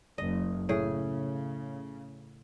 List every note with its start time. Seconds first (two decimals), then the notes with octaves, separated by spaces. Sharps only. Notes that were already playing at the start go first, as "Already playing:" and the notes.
0.18 F#1 D#5
0.69 A2 C#3 G#4